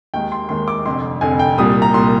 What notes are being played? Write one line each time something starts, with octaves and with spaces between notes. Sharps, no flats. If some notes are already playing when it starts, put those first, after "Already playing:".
D#2 D#3 G#3 G5
C6
D#2 D#3 G#3 C6
D6
F1 F2 D3 C6
F1 F2 D3 G#5
G5
C2 A#2 G3 D#6
A#5
C2 A#2 G3 C6